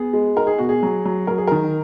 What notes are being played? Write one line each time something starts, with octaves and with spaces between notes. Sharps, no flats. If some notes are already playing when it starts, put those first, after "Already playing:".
Already playing: B3 G#4
G#3
D#4 A#4
G#4
B2 F#4
G#4
F#3
F#3
F#3 A#4
G#4
D#3 A#4